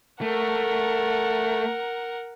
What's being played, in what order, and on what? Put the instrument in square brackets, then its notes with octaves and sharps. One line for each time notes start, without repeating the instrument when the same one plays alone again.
[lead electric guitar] A3 [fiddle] A#4 F#5